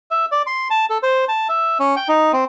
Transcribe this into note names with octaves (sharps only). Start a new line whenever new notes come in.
E5
D5
C6
A5
A4
C5
A5
E5
C#4
G5
D#4
C4